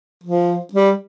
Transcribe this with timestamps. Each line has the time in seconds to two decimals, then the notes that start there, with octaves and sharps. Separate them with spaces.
0.24 F3
0.74 G3